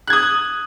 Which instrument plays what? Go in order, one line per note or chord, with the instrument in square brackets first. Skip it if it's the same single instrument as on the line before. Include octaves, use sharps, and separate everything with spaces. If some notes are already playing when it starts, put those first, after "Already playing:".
[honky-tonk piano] F#6
G#6
D#6